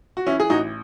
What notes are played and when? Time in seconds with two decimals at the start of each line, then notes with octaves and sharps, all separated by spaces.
0.17 F#4
0.26 E3 C#4 E4
0.40 G#4
0.50 A1 D#4 F#4